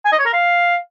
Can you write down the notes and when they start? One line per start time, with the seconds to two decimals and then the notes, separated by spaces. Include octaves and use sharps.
0.05 G#5
0.12 D#5
0.19 C#5
0.26 A#4
0.33 F5